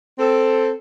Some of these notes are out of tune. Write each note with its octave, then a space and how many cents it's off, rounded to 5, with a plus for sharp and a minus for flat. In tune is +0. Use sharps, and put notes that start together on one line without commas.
C4 +0 A4 +5